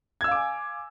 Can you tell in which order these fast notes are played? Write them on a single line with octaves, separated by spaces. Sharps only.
G#6 E6 F5 D6 G#5